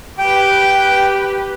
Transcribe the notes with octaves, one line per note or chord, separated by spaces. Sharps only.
G4 B4 G5